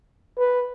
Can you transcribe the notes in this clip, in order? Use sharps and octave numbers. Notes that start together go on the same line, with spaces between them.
B4